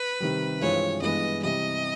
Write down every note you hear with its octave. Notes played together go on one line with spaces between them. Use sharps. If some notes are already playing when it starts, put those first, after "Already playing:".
Already playing: B4
C3 D#3 G3
G2 E3 G#3 C4 F4 C#5
G2 E3 G#3 B3 D#5
C3 E3 G3 D#5